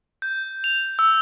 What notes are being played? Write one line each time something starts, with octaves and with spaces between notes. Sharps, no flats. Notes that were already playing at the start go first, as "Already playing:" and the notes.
G6
F7
E6